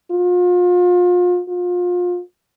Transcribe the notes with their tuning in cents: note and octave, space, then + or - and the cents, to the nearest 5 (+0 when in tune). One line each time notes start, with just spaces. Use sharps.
F4 +35
F4 +30